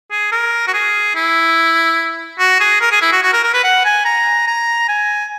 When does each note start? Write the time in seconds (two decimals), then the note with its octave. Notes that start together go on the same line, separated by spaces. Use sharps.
0.11 G#4
0.32 A#4
0.67 F#4
0.73 G#4
1.15 E4
2.39 F#4
2.60 G#4
2.81 A#4
2.91 G#4
3.02 E4
3.12 F#4
3.23 F#4
3.33 A#4
3.43 A#4
3.53 B4
3.64 F#5
3.85 G#5
4.05 A#5
4.47 A#5
4.88 G#5